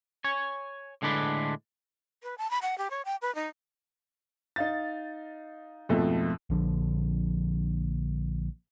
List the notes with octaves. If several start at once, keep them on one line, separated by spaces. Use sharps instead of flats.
C#5 G#5
A2 D3 G#3 D4 B4
B4
A5
B5
F#5
G4
C#5
G5
B4
D#4
D#4 F5 A6
F2 G#2 B2 F3 A3
A#1 D3 F3